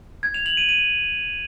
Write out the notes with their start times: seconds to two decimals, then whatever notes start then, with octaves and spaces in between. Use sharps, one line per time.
0.23 G#6
0.34 F7
0.46 F#7
0.57 D#7
0.69 D#7